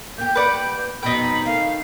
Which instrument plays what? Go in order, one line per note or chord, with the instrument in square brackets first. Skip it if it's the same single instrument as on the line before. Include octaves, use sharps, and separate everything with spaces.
[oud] A#3 G4 [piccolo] G6
[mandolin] B4 D5 F#5
[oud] F2 B2 F#3 [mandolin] D#4 G5 [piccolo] B5
[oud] D#3 A3 [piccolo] F5